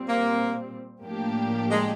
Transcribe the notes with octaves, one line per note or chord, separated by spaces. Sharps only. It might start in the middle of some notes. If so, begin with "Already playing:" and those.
Already playing: A#2 G3 C4
A#3
A2 F3 A#3 D4 G4
G#3